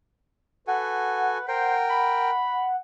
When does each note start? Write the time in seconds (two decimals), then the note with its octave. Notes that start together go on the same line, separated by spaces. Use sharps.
0.67 F#4 A4 B4 F#5 G#5
1.48 A#4 C5 G5
1.90 B5